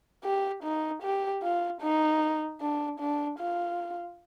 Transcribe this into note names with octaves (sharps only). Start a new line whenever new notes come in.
G4
D#4
G4
F4
D#4
D4
D4
F4